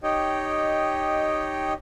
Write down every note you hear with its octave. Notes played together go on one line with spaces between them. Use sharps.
D#4 G4 C#5 D#5 G5